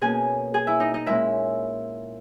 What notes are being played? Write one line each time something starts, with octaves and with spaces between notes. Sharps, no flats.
B2 A#3 C#4 G#4 G#5
G#4 G#5
E4 E5
D#4 D#5
D#4 D#5
A#2 G#3 C#4 E4 E5